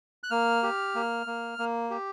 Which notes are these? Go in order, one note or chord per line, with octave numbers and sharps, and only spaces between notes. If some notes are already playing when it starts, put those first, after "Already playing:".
F#6
A#3 F6
G4
A#3
A#3
A#3
G4